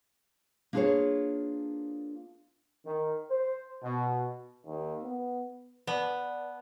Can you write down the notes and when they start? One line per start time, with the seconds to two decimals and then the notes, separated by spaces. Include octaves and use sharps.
0.73 A#3 D4 F4 G#4 B4 C#5
2.85 D#3
3.29 C5
3.83 B2
4.66 D#2
5.03 B3
5.87 B3 B4 D5 A5